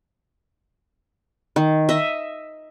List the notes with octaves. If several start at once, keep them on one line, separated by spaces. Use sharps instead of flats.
D#3
D#5 E5